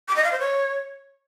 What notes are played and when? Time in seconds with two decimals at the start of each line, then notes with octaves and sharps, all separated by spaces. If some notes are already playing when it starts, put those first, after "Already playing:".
0.08 D6
0.16 D#5
0.24 F5
0.32 C5
0.40 C#5